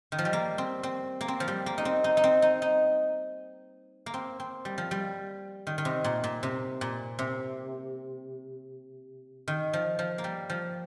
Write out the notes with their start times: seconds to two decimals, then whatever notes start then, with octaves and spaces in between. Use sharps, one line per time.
0.12 D#3
0.18 F3
0.25 G3
0.33 A#3
0.58 C4
0.83 C4
1.21 A#3
1.28 C4
1.40 F3
1.48 G3
1.66 A#3
1.78 D#4
1.85 C4
2.04 D#4
2.17 D#4
2.24 C4
2.42 D#4
2.62 D#4
4.06 A#3
4.14 C4
4.40 C4
4.65 G3
4.78 F3
4.91 G3
5.67 D#3
5.78 D#3
5.85 C3
6.04 A#2
6.24 A#2
6.43 C3
6.81 A#2
7.19 C3
9.48 D#3
9.73 F3
9.99 F3
10.18 A#3
10.24 G3
10.50 F3